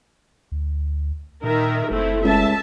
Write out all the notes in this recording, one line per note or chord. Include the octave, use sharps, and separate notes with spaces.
D2
A#2 D#3 A#4 E5
F#1 A3 C4 E4
C#2 E5 A5